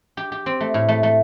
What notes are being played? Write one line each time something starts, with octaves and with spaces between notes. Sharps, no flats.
G4
G4
C4
A3
A2
A3
A3